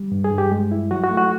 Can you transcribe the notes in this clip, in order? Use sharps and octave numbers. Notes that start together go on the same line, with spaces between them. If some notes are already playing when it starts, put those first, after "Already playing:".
Already playing: G3
G2
G#4
G2
G4
G#3
E4
F#3 F#4
F#4
A3
F#4